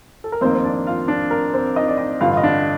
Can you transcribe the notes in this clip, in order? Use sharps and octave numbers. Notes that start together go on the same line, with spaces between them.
A4
A#4
F2 D#3 A#3 C4 C5
C5
D4 D5
F4 F5
D4 D5
A#4
C4 C5
D#4 D#5
D5
D#4 D#5
A1 G2 D3 F4 F5
D#5
D4 D5